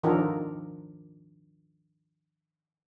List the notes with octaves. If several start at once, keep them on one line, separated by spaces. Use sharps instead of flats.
D#3 F3 D4 D#4 A4 A#4